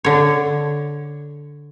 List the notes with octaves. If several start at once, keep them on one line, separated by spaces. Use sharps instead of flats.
D3 C#5